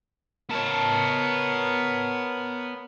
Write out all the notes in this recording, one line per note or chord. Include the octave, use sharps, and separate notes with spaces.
B3 A#4 C#5 A5